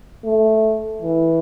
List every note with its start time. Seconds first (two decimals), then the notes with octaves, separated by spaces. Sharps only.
0.25 A3
1.02 E3